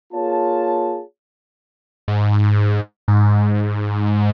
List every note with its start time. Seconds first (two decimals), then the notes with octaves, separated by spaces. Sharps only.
0.13 A#3 F4 G#4 C#5 A5
2.08 G#2
3.08 G#2